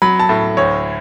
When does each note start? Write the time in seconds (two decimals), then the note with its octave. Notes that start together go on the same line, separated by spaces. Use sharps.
0.02 F#3 B5
0.19 A5
0.29 A2
0.57 D2 C#5